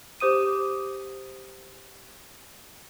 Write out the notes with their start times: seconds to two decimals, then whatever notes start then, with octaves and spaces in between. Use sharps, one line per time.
0.20 G4 C5 D#6 D#7